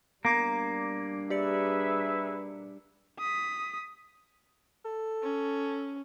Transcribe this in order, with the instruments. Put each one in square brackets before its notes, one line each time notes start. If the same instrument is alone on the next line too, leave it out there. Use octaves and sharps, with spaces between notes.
[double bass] G3 D4 [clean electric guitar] A#3 [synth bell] B3 D6 G#6
[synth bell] G4 D5 C#7 [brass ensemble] G#4 B4 E5
[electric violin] D#6 B6
[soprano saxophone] A4
[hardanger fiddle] C#4